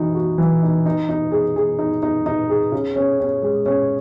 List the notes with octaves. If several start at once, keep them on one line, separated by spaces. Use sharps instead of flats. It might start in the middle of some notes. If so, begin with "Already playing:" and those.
Already playing: E3 D#4 F#4
F#4
E3
D#4
D#4
D#4
G#4
G#4
D#4
D#4
D#4
G#4
C#3
C#4
C#4
G#3
C#4